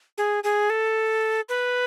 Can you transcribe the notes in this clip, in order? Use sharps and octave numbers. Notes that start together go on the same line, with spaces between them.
G#4
G#4
A4
B4